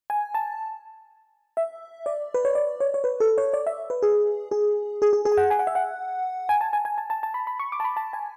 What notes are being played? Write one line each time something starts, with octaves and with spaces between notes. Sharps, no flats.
G#5
A5
E5
D5
B4
C#5
D5
C#5
C#5
B4
A4
C#5
D5
E5
B4
G#4
G#4
G#4
G#4
G#4
G#5
F#5
G#5
F#5
E5
F#5
G#5
A5
G#5
G#5
A5
A5
A5
B5
B5
C#6
D6
A5
B5
A5
G#5